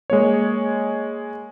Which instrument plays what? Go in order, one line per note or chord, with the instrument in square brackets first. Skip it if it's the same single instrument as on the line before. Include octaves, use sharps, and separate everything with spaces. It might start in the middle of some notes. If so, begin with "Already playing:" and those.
[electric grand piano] G#3 A#3 C#5